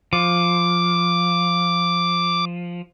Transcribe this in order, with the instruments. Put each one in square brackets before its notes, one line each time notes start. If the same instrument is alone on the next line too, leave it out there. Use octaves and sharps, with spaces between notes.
[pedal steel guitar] F3 [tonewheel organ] D6